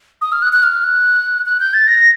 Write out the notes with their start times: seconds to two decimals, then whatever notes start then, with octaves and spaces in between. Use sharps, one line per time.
0.22 D#6
0.32 F6
0.42 F#6
0.53 F#6
0.63 F6
0.84 F#6
1.46 F#6
1.60 G6
1.74 A6
1.87 A#6